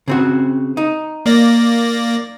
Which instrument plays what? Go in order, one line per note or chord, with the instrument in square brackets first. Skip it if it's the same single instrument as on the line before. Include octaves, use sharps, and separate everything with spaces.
[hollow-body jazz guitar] C#3 C4 F#4
D#4
[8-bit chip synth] A#3 D5 A#6